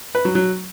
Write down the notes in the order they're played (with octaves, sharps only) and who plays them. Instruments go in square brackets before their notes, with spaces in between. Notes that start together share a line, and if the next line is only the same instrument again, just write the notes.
[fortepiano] B4
F#3
F#3